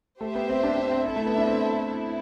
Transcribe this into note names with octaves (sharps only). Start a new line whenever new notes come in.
A3 G4 C5 E5
B3
C4
D4
D4
C4
C4 E4 A4 E5
A3
B3
D4
C4
E4 A4